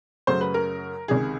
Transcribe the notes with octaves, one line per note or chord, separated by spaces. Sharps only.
F#2 C#3 F#3 A3 C5
B4
A#4
C#2 C3 D#3 G#4